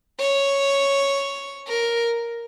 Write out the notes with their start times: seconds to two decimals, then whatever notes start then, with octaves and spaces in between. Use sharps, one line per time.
0.19 C#5
1.67 A#4